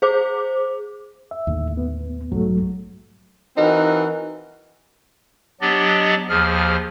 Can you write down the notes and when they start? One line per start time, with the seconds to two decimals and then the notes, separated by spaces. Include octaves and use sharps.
0.02 G#4 C5 D6
1.31 E5
1.47 D#2 A2 D3
1.77 B3
2.32 B1 G#2 F#3 A3
3.57 E3 C4 D#4 F#4 A#4
5.61 F#3 B3 D4 G4 D5 D#5
6.29 D#2 F3 G#4 F6